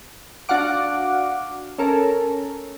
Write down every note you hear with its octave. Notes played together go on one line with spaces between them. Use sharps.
D4 F#4 F5 F#5 D6
C#4 A4 A#4